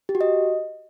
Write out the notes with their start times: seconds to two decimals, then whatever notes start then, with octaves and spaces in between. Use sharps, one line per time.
0.09 G4
0.15 F#4
0.21 D#5